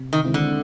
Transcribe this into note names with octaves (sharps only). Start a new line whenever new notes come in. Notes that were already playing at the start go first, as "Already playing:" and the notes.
Already playing: C3
D#3
D#3 G#3 C4 E4
D3